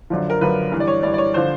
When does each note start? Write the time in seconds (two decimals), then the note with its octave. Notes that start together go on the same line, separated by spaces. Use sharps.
0.10 F#2 D3 F3
0.30 A#4
0.41 F#2 D3 F3 B4
0.72 G2 E3
0.80 D5
0.88 C#5
1.03 G2 E3 D5
1.14 D5
1.18 C#5
1.34 D3 F3 C5